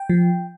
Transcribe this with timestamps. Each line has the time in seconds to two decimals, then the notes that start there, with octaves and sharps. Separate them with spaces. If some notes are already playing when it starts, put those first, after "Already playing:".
Already playing: G5
0.10 F3